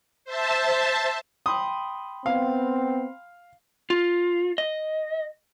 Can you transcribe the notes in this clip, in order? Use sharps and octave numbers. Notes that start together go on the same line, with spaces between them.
C5 E5 A5
G5 B5 C6 D#6
B3 C4 F5
F4
D#5